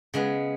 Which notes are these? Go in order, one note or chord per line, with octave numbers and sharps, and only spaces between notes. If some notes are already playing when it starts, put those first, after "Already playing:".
C#3 G#3 B3